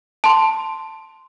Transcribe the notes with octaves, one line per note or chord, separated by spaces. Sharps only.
A5 C6